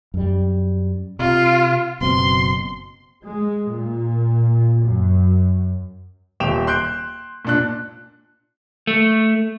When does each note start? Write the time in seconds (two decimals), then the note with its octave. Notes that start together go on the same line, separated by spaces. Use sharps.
0.14 F#2 G3
1.19 C3 F4
2.01 F#1 B2 C4 C6
3.24 G#3
3.69 A#2
4.81 F#2
6.40 D#1 G5 E7 F7
6.67 C6 F#6 G6 D7
7.45 A#2 D4 F#6
8.87 A3